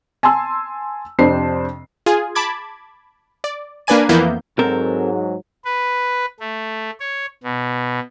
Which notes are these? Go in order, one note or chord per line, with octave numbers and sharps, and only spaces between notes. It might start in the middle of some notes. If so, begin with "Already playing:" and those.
G#5 A5 C6 E6
F2 C3 D4 C5 C7
F4 G#4 G#5
A5 B5 D6 G#6
D5
A#3 D4 B4 D5 G#5 D#7
F2 E3 A#3 B3 E4 G6
G#2 F#3 C4 A4 A#4
B4
A3
C#5
B2